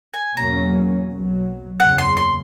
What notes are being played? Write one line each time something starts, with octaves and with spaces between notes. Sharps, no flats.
G#5
E2 B2 F#3 A#3 C#4 A#5
B1 B2 F#3
F#1 E2 C#3 F#5
C6
C6